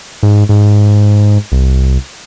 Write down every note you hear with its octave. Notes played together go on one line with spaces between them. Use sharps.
G#2
G#2
C2